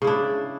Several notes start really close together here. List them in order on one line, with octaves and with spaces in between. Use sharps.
C#3 E4 D4